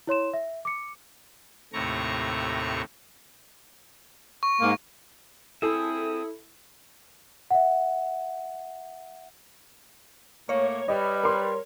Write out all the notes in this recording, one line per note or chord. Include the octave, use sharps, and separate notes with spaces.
E4 C#5 C6 E7
E5
D6 C#7
D#2 A2 C3 A3 A#5 C#6
C#6
G#2 A#3
C4 E4 G#4 A4 E5 D#6
E5 F#5
A2 A#3 C#5
G3 B4 D#5
A#4 C6